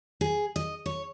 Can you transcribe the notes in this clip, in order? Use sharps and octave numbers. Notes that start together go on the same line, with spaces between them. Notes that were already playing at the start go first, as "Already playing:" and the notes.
G#4
D#5
C#5